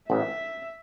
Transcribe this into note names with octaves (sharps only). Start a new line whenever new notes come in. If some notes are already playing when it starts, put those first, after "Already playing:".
A1 E5